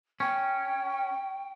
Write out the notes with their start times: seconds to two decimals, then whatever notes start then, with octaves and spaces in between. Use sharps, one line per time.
0.20 C#4 G5